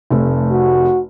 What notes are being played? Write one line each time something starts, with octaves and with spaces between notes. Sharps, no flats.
F1 C3 A3
F#4